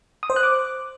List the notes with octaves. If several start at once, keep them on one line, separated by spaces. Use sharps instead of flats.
D#6
C5
F#6
D6